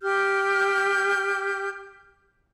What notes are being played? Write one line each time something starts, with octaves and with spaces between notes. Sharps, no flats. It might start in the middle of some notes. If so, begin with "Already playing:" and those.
G4 F6 G6